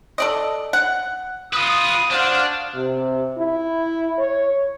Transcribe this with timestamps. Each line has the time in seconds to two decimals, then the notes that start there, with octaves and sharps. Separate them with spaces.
0.18 A4 D5 D#5
0.73 F#5
1.53 F4 B4 D#6
2.11 D4 F#4 C5 F5
2.75 C3
3.38 E4
4.19 C#5